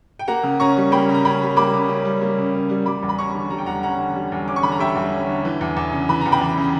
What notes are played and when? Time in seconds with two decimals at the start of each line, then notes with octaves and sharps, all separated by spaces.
0.19 G5
0.28 A#3 F#5 A#5
0.43 C#3
0.60 C#4 A#5 C#6
0.77 G3
0.92 A#3 G5 B5
1.09 C#3
1.14 A#5
1.25 C#4 G5 B5
1.41 G3
1.57 A#3 B5 D6
1.74 C#3
1.89 C#4
2.05 G3
2.22 A#3
2.38 C#3
2.54 C#4
2.69 G3
2.86 G3 B5 D6
3.03 E2
3.09 B5
3.18 C#4 A#5 C#6
3.34 D3
3.50 G3 A#5
3.58 G5
3.66 E2 F#5 A#5
3.83 C#4 F#5 A#5
3.99 D3
4.15 G3
4.32 E2
4.48 C#4 D6
4.56 C#6
4.63 D3 B5
4.72 A#5
4.79 G3 E5 G5
4.96 E2
5.12 C#4
5.29 D3
5.45 E3
5.61 E2
5.77 E2
5.92 C#3
6.09 E3 B5
6.21 E2 A#5
6.32 G5 B5
6.41 E2
6.58 C#3